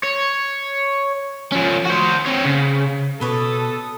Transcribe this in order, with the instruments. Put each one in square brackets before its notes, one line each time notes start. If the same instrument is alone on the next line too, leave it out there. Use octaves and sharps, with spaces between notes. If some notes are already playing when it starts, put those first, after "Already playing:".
[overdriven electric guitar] C#5
F3 C#4
F#4 C5
C4 C#5
C#3
[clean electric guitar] B2 [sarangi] A4 [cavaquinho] B4 C#5 D5 [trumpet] D#6